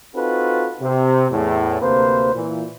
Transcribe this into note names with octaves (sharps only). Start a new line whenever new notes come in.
C4 D#4 F4 F#4 A4 B4
C3
E2 A2
D2 C3 A#3 B4 C5
A#2 E3